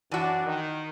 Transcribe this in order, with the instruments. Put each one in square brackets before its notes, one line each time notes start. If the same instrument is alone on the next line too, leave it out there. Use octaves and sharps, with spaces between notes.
[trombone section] F#2 D4 [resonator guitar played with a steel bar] E3 F#4
[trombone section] D#3